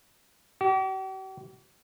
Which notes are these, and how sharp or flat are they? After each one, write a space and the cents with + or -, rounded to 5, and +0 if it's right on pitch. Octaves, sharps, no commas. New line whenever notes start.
G4 -45